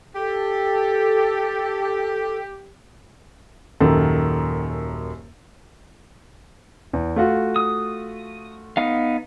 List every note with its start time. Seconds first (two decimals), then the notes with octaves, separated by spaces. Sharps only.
0.15 G4 A4
3.80 D#1 F#2 D#3 A4
6.93 E2
7.16 A3 F4 F#4
7.56 D#6
8.77 B3 D#4 F5